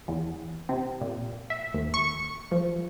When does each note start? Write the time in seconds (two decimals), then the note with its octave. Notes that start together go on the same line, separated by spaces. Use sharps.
0.08 E2
0.69 C3
1.01 A#2
1.50 E5
1.74 D#2
1.94 C#6
2.51 F3